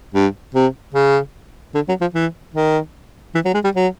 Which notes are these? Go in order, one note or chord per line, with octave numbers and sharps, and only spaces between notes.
G2
C3
C#3
D3
F#3
F3
E3
D#3
E3
F#3
G#3
G3
F#3